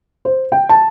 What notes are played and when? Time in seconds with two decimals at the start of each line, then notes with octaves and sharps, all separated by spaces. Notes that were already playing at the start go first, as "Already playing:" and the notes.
0.25 C5
0.52 G5
0.69 A5